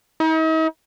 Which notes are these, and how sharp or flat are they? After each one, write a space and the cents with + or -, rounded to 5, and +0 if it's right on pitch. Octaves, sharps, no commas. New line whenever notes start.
D#4 +45